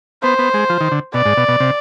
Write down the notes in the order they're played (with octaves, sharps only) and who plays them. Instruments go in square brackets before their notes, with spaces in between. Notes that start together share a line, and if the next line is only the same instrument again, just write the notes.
[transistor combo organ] B3 [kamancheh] C5
[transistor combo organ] B3
G#3
F3
D#3
D3
[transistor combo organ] B2 [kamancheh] D5
[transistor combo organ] G#2
B2
B2
C3